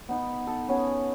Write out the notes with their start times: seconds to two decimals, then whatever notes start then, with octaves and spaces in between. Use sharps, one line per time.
0.09 B3 D#4
0.47 A4
0.68 B3 C#4 G#4